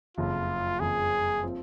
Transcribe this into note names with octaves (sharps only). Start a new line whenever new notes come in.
F#1 F2 C#3 F4
F#1 F2 C#3 G#4
F3 C4 F4